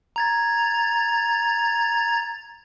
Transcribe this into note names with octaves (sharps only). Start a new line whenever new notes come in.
A#5 G#6 A6